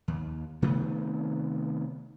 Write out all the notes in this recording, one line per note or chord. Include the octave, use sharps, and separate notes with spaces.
D#2
C3 D#3 A3 B3